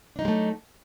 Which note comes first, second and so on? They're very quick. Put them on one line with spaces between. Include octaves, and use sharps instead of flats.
D4 D#4 F#3 G#3 A3